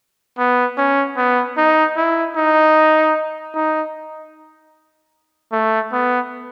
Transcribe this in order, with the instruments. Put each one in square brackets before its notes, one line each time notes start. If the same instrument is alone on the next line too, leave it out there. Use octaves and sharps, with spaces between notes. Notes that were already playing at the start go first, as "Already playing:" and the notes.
[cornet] B3
C#4
B3
D#4
E4
D#4
D#4
A3
B3